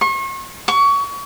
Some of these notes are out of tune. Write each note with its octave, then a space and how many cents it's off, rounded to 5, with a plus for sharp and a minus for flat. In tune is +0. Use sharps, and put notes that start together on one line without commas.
C#6 -40
C#6 +25